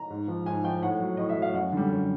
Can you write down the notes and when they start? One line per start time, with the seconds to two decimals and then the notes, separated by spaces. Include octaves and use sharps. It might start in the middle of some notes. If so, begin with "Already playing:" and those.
Already playing: A#5
0.10 G#2
0.28 F3
0.46 G#2 G#5
0.64 F3 G5
0.82 A2 F#5
1.01 F#3
1.17 A2 D#5
1.29 E5
1.37 F#3
1.42 F5
1.54 F#2 F#5
1.72 D3 G3
1.91 F#2